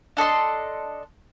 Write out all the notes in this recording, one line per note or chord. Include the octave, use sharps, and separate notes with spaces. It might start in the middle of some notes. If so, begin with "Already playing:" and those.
D4 A4 D#5 C6